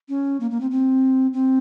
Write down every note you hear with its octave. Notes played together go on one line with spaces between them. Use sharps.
C#4
A#3
A#3
C4
C4
C4